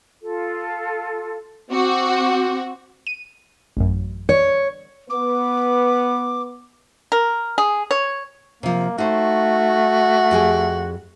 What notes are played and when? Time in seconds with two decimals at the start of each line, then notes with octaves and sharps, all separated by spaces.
0.22 F4 A4
1.71 C4 F#4 C5 D6
3.07 D#7
3.77 A1 F#2
4.29 C#5
5.10 B3 B4 D6
7.12 A#4
7.58 G#4
7.91 C#5
8.63 C3 F3 A#3
8.98 A3 D#4 F#4 C5
10.31 F2 G4 G#4